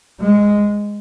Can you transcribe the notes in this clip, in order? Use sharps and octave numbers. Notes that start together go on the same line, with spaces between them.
G#3